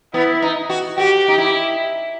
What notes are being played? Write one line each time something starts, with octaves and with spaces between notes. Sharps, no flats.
B3 E4
D#4
F#4
F#4 G4
D#4
E4